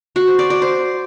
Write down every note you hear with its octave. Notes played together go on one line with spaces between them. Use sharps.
F#4
C5
D5
D5
C5